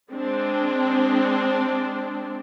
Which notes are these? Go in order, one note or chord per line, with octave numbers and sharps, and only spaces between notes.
G#3 C4 D4